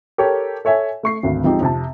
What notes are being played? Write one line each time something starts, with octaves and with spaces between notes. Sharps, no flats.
G4 A4 A#4 C#5
A4 C#5 E5 G#5
A3 C#6 C7
G#1 D2
F3 G#3 C4 D#4 G4
F2 C3 A5